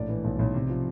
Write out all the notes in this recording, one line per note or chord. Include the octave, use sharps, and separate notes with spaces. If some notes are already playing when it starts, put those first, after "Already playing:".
Already playing: A#1 A2 D5
E3
B1
B1
C3
F3